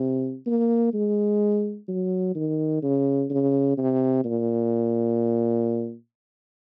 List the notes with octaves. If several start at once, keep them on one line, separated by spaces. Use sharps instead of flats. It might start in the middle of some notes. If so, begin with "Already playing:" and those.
Already playing: C3
A#3
G#3
F#3
D#3
C#3
C#3
C3
A#2